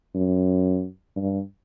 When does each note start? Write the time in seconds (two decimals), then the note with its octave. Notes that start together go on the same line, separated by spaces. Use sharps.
0.15 F#2
1.16 G2